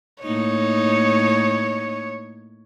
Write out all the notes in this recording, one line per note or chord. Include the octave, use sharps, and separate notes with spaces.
A2 A#3 D#4 C#5